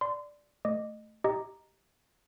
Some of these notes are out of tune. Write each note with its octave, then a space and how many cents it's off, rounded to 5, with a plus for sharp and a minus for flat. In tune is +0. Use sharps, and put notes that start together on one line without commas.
D5 +0 C6 -25
A3 +0 D#5 -20 D6 +5
G4 +0 D#5 +0 A#5 +0